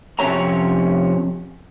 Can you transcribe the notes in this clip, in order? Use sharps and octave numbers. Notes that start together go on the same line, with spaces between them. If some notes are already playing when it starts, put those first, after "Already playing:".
F2 C3 C#4 C#5 A#5